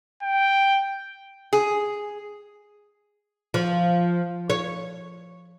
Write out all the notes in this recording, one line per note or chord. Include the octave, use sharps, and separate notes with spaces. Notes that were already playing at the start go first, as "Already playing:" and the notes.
G5
G#4
F3
C#5